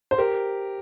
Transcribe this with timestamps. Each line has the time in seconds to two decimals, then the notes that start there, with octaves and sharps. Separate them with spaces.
0.11 C5
0.18 G4 A#4